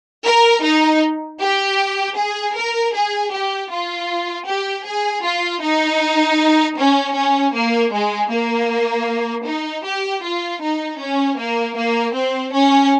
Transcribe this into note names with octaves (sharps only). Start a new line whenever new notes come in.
A#4
D#4
G4
G#4
A#4
G#4
G4
F4
G4
G#4
F4
D#4
C#4
C#4
A#3
G#3
A#3
D#4
G4
F4
D#4
C#4
A#3
A#3
C4
C#4